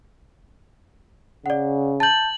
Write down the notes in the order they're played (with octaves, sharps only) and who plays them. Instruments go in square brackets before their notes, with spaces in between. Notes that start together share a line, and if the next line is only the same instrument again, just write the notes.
[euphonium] C#3 [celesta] D5 F#5
[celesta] A5 G6 [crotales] A6 F#7